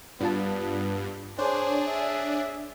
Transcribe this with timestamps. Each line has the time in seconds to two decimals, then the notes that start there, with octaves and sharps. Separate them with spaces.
0.21 G2 B3 D4 F4 A5
1.39 D4 G#4 C5 C#5
1.88 E5